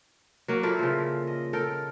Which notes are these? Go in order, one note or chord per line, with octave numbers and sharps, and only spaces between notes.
F#3 A#3
A#2 E4 A4 A#4
C#3 F3
D#5
A4 A#4 G5